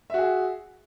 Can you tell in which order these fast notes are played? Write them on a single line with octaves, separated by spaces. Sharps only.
E5 F#4 G#4